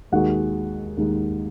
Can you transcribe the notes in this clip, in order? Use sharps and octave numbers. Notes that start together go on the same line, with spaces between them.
D#2 D#3 G#3 F#4 F#5
D#2 D#3 G#3